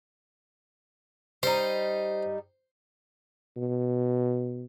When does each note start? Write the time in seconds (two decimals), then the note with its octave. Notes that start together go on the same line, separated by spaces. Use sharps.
1.43 G3 D#4 C5
3.57 B2